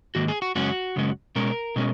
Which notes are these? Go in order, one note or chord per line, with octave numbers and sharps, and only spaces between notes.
G#2 D#3 A#3 F#4
G#4
F#4
F#2 C#3 G#3 C#4 F#4
F#2 C#3 G#3 C#4
B2 G#3 C#4 A#4
B2 G#3 C#4